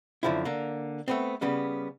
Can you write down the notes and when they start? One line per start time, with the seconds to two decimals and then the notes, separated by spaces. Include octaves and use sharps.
0.23 F#2 D3 F3 C4 E4
0.45 D3 A#3
1.08 A3 B3 C4
1.41 C#3 G3 B3 C#4